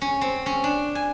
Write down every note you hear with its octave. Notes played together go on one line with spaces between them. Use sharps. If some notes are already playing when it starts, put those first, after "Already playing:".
C#4
C4
C#4
D4
G#5